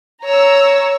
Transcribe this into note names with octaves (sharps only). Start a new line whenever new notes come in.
C#5 A#5 E6